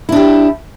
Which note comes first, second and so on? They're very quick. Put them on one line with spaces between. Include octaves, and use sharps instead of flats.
E4 D4 G4